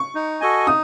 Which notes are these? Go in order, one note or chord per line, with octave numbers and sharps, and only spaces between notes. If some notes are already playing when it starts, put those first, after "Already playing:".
Already playing: C#6
D#4
F#4 A4 D#5 G#5
D#4 D#6